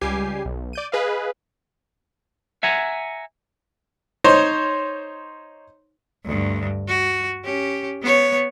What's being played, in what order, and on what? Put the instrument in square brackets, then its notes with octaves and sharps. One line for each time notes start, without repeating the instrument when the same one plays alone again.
[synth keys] C#2 G3 G4 G#5 C7
B1
D5 G6 D#7
G#4 B4 D#5 F5
[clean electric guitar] E5 F#5 G#5 A#5
[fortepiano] D#4 C5 C#5
[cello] D2 G2
F#4
C#4 G4
B3 C#5